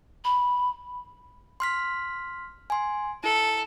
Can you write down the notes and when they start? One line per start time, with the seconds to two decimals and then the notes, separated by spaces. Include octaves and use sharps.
0.24 B5
1.60 C6 F6 B6
2.70 G#5 C6
3.24 E4 A4